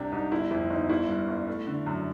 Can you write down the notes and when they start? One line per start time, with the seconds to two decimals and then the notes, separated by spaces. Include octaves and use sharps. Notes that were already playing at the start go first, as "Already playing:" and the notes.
Already playing: C2 C3 D4 G4
0.12 C2 D#4
0.32 G1 E4
0.51 F2 E4
0.70 G1 D#4
0.89 G1 E4
1.09 G2
1.28 G1
1.48 A3
1.67 D3
1.86 F#2